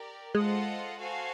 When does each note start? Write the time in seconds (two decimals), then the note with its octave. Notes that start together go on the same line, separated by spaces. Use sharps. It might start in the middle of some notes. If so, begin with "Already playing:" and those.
Already playing: G4 A#4 D5
0.35 G#3 F4 A4 C5 D#5 F#5
0.98 F#4 A4 C5 F5 G#5